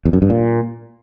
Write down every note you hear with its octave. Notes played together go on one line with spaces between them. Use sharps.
E2
F#2
G2
A#2